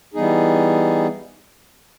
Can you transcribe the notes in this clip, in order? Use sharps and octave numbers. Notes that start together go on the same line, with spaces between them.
E3 G3 B3 D#4 G#4